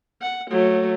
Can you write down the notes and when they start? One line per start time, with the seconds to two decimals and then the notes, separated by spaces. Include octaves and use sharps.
0.22 F#5
0.51 F#3 A3